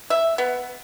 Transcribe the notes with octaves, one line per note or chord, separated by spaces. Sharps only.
E5
B3